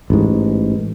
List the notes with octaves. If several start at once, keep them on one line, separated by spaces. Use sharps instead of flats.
A1 G#2